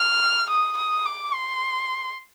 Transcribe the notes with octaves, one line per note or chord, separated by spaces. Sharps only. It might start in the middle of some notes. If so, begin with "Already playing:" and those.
Already playing: F6
D#6
D#6
D6
C6